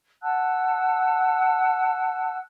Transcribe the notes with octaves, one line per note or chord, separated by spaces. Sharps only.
F#5 A5 E6 F#6